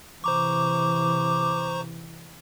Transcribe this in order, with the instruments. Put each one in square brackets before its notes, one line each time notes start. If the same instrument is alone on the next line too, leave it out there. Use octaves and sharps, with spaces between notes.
[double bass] C3 E3 [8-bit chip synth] C5 A#5 C#6 [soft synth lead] D6